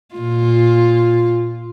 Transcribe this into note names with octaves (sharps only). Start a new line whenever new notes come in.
A#2 F4